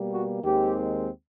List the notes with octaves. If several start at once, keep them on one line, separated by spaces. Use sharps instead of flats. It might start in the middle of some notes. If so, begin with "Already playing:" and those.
Already playing: B2 G3 A#3
F#4
D#2 D#3 G#3 C4 G4